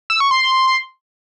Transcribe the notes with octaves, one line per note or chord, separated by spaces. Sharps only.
E6
C#6
C6